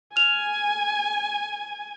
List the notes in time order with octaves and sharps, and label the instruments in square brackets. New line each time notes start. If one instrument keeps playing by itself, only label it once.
[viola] G#5 [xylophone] F6 F7